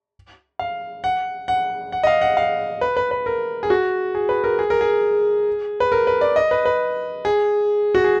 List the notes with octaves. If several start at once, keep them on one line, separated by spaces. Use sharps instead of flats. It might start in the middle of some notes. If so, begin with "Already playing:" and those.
F5
F#5
F#5
F#5
D#5
F5
F#5
F5
B4
B4
B4
A#4
G#4
F#4
G#4
B4
A#4
G#4
A#4
G#4
B4
A#4
B4
D5
D#5
B4
B4
G#4
F#4
G#4